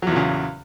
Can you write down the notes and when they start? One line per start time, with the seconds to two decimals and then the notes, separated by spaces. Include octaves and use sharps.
0.02 F#3
0.07 E2
0.11 A#2
0.16 C#3